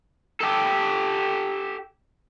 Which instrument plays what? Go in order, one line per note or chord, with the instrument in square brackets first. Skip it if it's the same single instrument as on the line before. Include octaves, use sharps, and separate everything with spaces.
[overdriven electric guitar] G4 A4